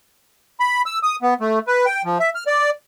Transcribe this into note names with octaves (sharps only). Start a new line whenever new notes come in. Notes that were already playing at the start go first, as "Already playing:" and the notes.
B5
E6
D#6
B3
A3
B4
G5
F3
E5
F6
D5